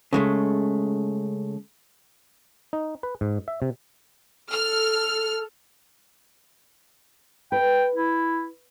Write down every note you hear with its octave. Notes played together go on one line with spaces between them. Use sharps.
C#3 G#3 A3
D#4
B4
G#2
E5
C3
A4 F6
B4 G5
E4